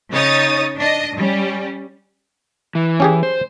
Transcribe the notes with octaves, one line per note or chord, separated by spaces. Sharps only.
C#3 D#4 C#5 D#6 A6
D4 D#5
G3 C#4
E3
C#4 G4 G#4
C5